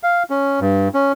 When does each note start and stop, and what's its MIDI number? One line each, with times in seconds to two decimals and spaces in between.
0.03 0.23 77
0.30 0.60 61
0.61 0.88 43
0.94 1.12 61